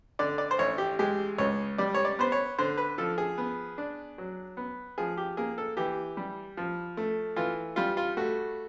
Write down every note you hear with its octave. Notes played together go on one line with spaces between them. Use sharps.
D3 D5
D5
C5
A1 C#5
G4
G#3 G4
C#2 C#5
G3 D5
C#5
D5
B3 C5
C#5
D3 C5
B4
F3 A4
G#4
B3
D4
F#3
B3
F3 G#4
G4
A#3 G#4
A4
E3 G4
G3
F3
A3
E3 F4
G3 F4
F4
A3 F#4